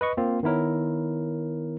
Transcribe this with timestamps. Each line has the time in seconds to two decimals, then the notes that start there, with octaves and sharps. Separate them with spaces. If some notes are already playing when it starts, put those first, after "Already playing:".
0.01 B4 D#5 C#6
0.17 A#3 C4 F4
0.43 D#3 B3 E4 A#4 C#5